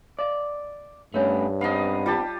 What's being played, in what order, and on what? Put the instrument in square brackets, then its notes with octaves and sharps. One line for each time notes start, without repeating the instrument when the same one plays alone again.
[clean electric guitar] D5 [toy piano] D#5 F5
[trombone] G2 [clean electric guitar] A3 B3 C#4 [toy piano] A#4 C#5
[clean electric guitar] B3 C4 D#4 [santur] D#5 F5
[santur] G3 G4 A5 [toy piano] F4